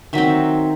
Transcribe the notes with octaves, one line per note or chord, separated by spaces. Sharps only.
D#3 F#3 C4 E5